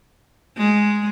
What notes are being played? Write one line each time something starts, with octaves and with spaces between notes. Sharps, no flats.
G#3